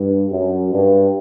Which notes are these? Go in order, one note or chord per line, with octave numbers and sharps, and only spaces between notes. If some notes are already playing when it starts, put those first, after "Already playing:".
Already playing: G2
F#2
G2